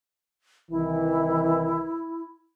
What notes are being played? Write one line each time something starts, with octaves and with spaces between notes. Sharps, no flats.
C2 D#3 E3 E4